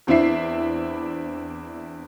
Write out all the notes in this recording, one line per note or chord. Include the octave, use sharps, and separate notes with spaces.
E2 C4 D4 E4 E5 C7